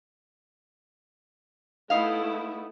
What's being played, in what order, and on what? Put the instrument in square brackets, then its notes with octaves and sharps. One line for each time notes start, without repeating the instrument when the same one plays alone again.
[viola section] A3 E4 [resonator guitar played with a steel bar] B3 D#4 F5